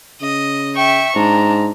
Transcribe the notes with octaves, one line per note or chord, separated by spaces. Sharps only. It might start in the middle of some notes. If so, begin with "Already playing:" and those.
C#3 D#5
E5 G5 C#6
G#2 D4 A#5